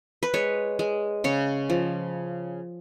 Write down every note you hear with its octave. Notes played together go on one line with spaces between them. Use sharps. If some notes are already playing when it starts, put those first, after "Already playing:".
B4
G#3 C#5
G#3
C#3 C#5
F3